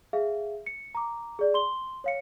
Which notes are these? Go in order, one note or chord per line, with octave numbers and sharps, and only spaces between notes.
G#4 E5 F5
C#7
A#5 D6
G#4 D5
C6 G7
C#5 F5 C#7